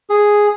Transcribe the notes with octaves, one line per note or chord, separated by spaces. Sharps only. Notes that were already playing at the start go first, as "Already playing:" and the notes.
G#4